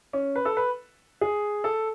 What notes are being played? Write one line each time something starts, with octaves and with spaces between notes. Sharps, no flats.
C#4
B4
A4
B4
G#4
A4